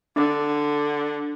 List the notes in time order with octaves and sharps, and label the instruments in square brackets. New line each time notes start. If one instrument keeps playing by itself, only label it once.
[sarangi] D3 [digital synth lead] D4